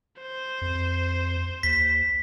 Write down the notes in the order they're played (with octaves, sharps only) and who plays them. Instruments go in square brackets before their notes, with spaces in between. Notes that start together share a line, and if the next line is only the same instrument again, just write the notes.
[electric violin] C5
[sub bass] F2
[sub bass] D#2 [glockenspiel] B6